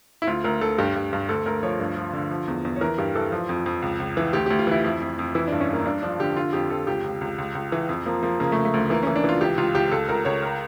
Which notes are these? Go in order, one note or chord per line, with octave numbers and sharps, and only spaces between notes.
E4
D2 F4
D2 A#4
D2 A4
G2 G4
G2
G2
D2 A4
D2 A#4
F3 C#5
G2
F3
D3
F3
E2
E2
C#5
E3 A#4
G2 G4
E3 A4
F3
F2
F2
C#2
C#2
E3
D2 G4
D2 G4
F4
E3 E4
F2
F2
F2
E3 E4
G2 D4
C#4
G2 A#3
G2 D4
F3 D4
D3 G4
D3 F4
F2 G4
F2 A4
C#2 G4
C#2
C#2
C#2
C#2
E3
F2
F3 A#3
F3 A#3
C#3 A#3
A3
C#3
A3
D2
E3 A#3
E3 C#4
D4
E3 F4
C#2 G4
C#2 F4
C#2 G4
C#2 A4
C#2 A#4
C#2 C#5
A#4